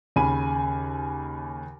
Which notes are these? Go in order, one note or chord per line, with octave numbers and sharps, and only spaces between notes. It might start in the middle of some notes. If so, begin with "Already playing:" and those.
D#2 C#3 G#5 B5 D#7